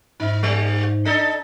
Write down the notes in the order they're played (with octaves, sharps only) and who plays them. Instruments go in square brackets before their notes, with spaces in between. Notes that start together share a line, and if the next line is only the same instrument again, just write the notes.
[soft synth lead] G#2 [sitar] D#4
[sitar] G3
D4 D#4 A4